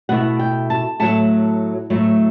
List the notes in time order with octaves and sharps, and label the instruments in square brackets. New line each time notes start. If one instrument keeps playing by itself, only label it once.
[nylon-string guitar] B2 A3 E4 F#5
G5
A5
A2 F#3 A3 A5
A2 F#3 A3